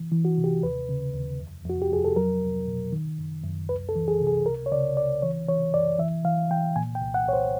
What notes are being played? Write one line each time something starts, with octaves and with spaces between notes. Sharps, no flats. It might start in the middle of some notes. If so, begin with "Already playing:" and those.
Already playing: E3
E3
F#4
C3
G4
D#2 B4
C#3
D#2
F2
F2 F#4
G4
F2 G#4
A4
F#3 A#4
C#2
B2
D#3
F#2
F#2
C#2 B4
A4
E3
G#4
C3
G#4
C#2 A#4
C#5
C#3 D5
C#2 D5
E3 C#5
E3 C#5
F#2 D5
E3 E5
E3 F5
E3 G5
A#2 G#5
G5
C2
F#5
C2 C#5
C5